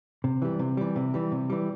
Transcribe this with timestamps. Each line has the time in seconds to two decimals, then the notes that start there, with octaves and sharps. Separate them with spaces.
0.24 C3
0.42 E3 G3
0.59 C3
0.77 E3 G3
0.96 C3
1.14 E3 G3
1.32 C3
1.50 E3 G3